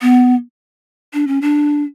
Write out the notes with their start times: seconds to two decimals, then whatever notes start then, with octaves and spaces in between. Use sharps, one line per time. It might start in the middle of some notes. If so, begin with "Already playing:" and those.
0.02 B3
1.14 D4
1.27 C#4
1.42 D4